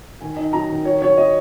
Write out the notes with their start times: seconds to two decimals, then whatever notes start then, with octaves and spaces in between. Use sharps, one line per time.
0.21 D#3 G#5
0.37 D#4
0.53 F#3 A#5
0.70 D#3
0.85 F#3 C#5
1.02 F#3 C#5
1.18 F#3 D#5